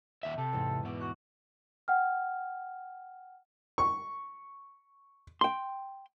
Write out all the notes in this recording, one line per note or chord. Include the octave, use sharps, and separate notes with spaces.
D#2 E5
C3 A4 A6 B6
E2 G#2
B2 E5 D6
F#4 F#6
F#5 G5 F6
C#6
G5 C6